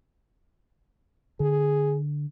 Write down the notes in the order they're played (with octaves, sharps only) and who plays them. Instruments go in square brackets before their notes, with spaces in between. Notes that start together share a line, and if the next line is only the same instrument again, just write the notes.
[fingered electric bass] D3 [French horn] G#4